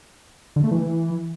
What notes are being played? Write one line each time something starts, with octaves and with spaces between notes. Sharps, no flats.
D3
A3
E3